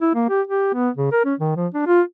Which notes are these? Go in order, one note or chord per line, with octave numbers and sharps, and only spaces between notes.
E4
A#3
G4
G4
B3
C#3
A#4
C#4
D#3
F3
D4
F4